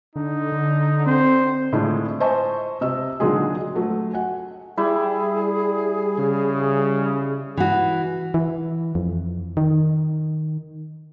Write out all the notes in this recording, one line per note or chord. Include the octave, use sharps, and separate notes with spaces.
D3 D#4
D3
C4 C5
A2 D3 G#3 D4 E4 F4
C5 D#5 E5 G#5 A5 C#6
C3 D#5 E6
A#2 D3 F#3 G#3 D#4 G#4
F#3 A3
F#5 G#5
G3 E4 G#4
C#3
E3 F#4
E3
F2
D#3